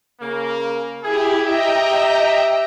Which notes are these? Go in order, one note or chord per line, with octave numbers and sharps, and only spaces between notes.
C#3 A#3
E4 G4 G#4
G4 D#5 E5 G5 A#5